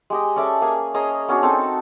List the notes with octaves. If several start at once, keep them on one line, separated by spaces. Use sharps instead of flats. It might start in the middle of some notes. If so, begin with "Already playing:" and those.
G#3 G4 D#5
C#4 A4 D5 E5
A#3 G#4 G#5 D#6
C#4 G#4 D#5 A#5
B3 C#4 D4 F#4
C4 D#4 A4 A5